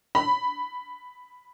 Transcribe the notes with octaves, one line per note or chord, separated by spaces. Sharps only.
B5